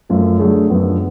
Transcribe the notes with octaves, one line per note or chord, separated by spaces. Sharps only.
F#2 F3 A3 C#4 F4
D3 F#3 A3 D4 G#4
F#2 F3 B3 D4